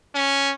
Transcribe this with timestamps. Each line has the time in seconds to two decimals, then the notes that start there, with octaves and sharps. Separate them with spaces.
0.15 C#4